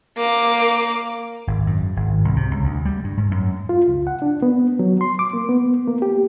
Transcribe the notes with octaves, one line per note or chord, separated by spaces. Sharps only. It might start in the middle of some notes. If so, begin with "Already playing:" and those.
A#3 D6
G#1
F#2
G#1
C2
C3
C#2
D2
G3
G2
G#2
F#2
F4
C#2
F#5
D4
B3
F#3
C6
D6
A#3
B3
A#3
G4